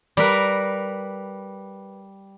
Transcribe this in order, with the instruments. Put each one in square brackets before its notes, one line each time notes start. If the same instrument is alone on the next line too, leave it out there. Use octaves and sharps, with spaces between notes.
[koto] G3 A#4 B4